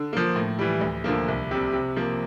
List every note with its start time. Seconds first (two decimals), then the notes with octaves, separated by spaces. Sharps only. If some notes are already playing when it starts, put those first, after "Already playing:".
Already playing: D3
0.13 F3 A#3
0.36 A2
0.59 E3 G3
0.81 D2
1.04 D3 F3 A#3
1.28 C2
1.51 C3 G3
1.73 C3
1.96 F3 A#3